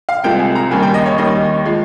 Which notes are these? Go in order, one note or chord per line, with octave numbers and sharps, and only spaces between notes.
F5
C2 C3 F3 G#3 G5
G#5
A#5
D#2 C#3 G3 G#5
G5
D#5
C#5
D#2 D#3 G3 D#5
F3 G#3